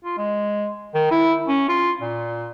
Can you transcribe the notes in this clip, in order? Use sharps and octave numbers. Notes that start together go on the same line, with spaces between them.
F4
G#3
D#3
E4
C#4
F4
A#2